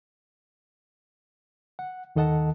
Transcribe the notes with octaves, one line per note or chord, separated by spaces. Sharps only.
F#5
D#2 D#3 A4 D#5 F#5 A5